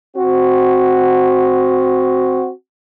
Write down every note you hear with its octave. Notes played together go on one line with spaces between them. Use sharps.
C4 F#4